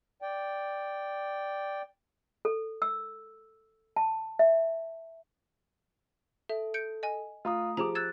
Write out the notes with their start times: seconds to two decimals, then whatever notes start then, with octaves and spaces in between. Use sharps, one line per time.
0.22 D5 G5
2.45 A4
2.82 E6
3.96 A5
4.39 E5
6.49 A4 E5
6.74 G6 C#7 D7
7.03 D#5 G#5
7.45 A3 F4 A#5 D#6
7.77 F3 G4 G#4 A#5 D6
7.95 E6 F#6 G#6 A6 E7